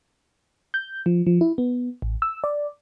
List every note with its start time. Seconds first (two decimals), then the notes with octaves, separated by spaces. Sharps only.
0.74 G6
1.06 F3
1.27 F3
1.41 E4
1.58 B3
2.02 A1
2.22 E6
2.44 D5